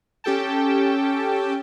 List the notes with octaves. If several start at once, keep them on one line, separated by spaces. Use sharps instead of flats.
C#4 G4 A4 G5 A5